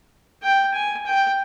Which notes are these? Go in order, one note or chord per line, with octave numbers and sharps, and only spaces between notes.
G5
G#5
G5